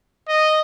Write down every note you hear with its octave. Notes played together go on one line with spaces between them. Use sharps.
D#5